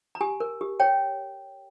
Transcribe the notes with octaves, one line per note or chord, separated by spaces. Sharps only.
A#5
G4 G#5
A#4
G4
C#5 G5